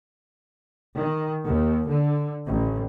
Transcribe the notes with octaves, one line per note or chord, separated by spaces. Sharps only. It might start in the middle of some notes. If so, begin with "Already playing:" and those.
D#3
D#2
D3
A1